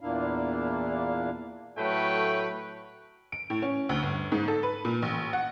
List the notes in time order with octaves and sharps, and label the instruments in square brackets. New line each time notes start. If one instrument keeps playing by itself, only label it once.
[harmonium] E2 A#2 A#3 D4 E4 F5
[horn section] A2 F#3 A3 B4 C#5 G5
[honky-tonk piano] D7
A2
C#4
D2
G1
G#2
A4
B4
A#2
A1
F#5